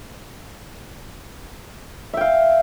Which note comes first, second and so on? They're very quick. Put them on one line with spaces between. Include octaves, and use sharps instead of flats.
E5 G5 F5